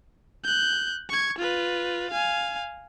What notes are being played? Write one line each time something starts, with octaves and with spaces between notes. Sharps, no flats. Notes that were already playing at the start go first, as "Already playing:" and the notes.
F#6 G6
C#6 G#6
F4 B4
F5 G#5